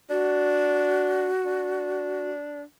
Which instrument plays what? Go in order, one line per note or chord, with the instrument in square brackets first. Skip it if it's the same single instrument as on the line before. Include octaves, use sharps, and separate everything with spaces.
[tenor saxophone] D4 [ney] F#4
[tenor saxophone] D4